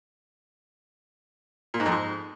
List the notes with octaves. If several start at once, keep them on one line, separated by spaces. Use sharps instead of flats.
A#2
G#2
F2
G#2